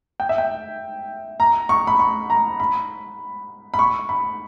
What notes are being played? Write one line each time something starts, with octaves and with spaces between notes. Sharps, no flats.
G5
E5
G5
A#5
C#6
B5
C#6
A#5
B5
B5
C#6
B5